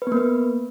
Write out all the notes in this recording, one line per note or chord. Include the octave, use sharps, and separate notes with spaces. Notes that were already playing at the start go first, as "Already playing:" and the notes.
B4
B3
A#3
B4